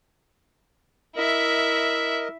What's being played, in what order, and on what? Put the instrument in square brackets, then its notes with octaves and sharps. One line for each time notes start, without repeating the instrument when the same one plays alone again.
[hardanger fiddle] E4 E5 [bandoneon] A#4 D#5